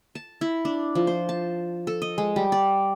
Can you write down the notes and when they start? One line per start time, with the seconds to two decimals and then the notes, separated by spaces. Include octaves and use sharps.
0.15 A5
0.41 E4
0.65 D4
0.95 F3
1.07 C5
1.29 A5
1.87 A4
2.02 D#5
2.18 G#3
2.36 G3
2.52 D5